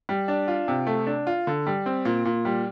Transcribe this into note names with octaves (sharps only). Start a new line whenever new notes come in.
G3
D4
F4
C3
A3
D4
F4
D3
G3
C4
A#2
A#2
G3